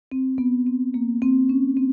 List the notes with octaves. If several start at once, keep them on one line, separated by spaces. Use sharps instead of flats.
C4
B3
C4
A#3
C4
C#4
C4